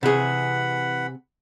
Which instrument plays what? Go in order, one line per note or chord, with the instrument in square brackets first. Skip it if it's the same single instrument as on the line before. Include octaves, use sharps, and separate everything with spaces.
[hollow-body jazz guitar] C3 G#4 [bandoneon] E3 F#5 B5